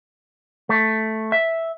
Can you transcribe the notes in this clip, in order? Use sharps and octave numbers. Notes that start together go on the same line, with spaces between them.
A3
E5